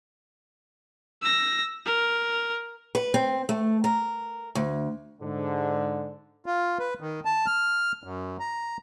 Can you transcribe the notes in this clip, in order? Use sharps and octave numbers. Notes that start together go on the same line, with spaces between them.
E6 A#6
A#4
B4
C4
A3
A#4
D2
G#2 D3
F4
B4
D#3
A5
F6
F#2
A#5